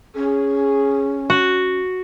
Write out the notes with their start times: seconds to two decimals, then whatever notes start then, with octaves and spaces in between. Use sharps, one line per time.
0.15 C#4 G#4
1.30 F#4